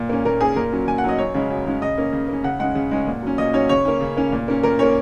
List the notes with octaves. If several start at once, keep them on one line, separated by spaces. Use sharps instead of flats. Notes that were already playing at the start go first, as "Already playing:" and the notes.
Already playing: A#2
A#3 C#4
A#2 A#4
A#3 C#4 G#4
A#2 A#4
F#3 C#4
A#2 G#5
F#5
F#3 C#4 D#5
F#2 C#5
C#3 G#3 C#4
F#2
C#3 G#3 C#4
C#3 D#5
A#3 C#4
C#3
A#3 C#4
C#3 F#5
G#3 C#4 F#5
C#3
G#3 C#4
A#2
F#3 C#4
A#2 D#5
F#3 C#4 C#5
C#3 C#5
A#3 C#4
C#3
A#3 C#4
A#2
A#3 C#4
A#2 A#4
A#3 C#4 C#5